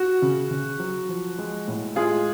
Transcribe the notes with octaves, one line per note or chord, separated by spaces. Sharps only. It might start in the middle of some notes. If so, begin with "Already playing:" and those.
Already playing: F#4
C#3
C#3
F#3
F3
G#3
A2
G#3 F4 G#4